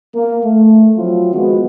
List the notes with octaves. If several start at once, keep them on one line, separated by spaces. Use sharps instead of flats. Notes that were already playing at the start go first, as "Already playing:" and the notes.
A#3
A3
F3 F#3 C4 E4 F4
D#3 F3 G#3 B3 F#4